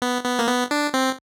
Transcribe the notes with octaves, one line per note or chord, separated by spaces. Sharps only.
B3
B3
A#3
B3
D4
C4